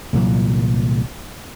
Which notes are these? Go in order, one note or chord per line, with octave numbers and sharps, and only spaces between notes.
C2 A#2 E3 F#3